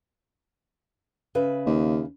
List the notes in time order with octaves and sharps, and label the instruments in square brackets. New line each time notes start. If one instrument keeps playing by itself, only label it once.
[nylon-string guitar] C#3 B4 E5
[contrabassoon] D#2